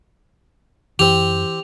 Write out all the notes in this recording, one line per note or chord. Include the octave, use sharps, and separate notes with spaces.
F#2 E3 C4 G4 F7